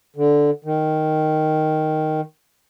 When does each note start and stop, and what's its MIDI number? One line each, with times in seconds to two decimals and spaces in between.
0.16 0.50 50
0.64 2.21 51